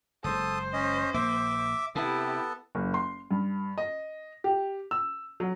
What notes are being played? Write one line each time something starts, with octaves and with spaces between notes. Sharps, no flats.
F#1 G#3 A4 C5 D#6
C#4 D#5
A#1 A#3 E5 D6
C3 B3 E4 G4 A4
F#1
C6
G2
D#5
G4
E6
F#3